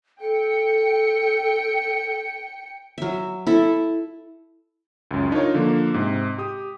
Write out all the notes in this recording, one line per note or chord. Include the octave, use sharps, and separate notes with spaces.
A4 G5 C#7
F#3 E5
E4 A4 E5
C#2 F#2
D4 D#4 F4 A#4 C#5
D3 F3 A#3
G#2 C3
G4 D#6